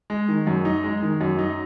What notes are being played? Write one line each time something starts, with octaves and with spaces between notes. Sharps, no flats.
G#3
D#3
F#2
D#4
G#3
D#3
F#2
D#4